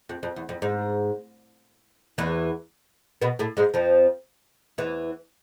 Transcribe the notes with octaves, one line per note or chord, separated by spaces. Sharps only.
F2
F2
E2
F2
G#2
E2 E3
B2 B3
A2 A3
G#2 G#3
F2 F3
E2 E3